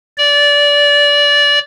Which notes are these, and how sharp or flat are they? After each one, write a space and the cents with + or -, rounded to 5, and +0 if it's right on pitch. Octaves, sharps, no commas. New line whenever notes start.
D5 -20